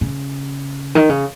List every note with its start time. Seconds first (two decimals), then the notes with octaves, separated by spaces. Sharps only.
0.01 C#3
0.95 D#3
1.09 C#3